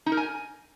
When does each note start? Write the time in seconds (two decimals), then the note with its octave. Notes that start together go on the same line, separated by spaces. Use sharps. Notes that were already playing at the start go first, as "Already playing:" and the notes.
0.06 D#4
0.12 A#4
0.17 G#5